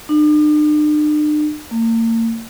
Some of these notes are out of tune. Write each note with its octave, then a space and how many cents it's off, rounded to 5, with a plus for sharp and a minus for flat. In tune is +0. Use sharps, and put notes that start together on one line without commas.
D4 +45
A#3 -40